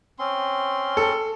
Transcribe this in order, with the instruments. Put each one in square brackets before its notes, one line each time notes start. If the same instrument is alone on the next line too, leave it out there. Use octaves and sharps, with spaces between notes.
[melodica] C4 C#4 C6
[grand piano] A4